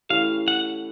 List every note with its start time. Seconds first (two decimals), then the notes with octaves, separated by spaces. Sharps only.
0.09 E3 A3 C#4 E4 G4 F5
0.48 F#5